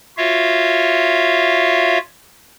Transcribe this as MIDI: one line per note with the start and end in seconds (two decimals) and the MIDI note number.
0.17 1.98 65
0.17 1.98 66
0.17 1.98 73
0.17 1.98 76
0.17 1.98 77